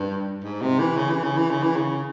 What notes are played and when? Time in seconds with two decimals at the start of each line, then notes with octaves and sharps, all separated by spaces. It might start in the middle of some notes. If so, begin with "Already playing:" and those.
Already playing: G2
0.44 G#2
0.62 C3
0.80 E3
0.97 C#3
1.10 E3
1.24 C#3
1.38 E3
1.51 C#3
1.63 E3
1.76 C#3